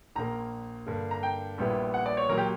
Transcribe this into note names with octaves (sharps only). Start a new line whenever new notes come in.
A#1 A#2 A#3 A#5
G2 D3 A#3
A#5
G5
A#1 A#2 G3 B3 E4
F#5
D5
C#5
A#2 F#3 A#4
G4